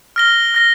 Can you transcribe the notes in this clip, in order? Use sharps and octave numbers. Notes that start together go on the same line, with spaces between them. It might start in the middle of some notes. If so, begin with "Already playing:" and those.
F6 A#6 G7
F6 A#6 G7